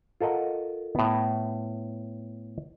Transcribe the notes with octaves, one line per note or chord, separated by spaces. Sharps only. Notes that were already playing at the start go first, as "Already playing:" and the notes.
F4 A4 A#4 D#5 F#5
A2 B3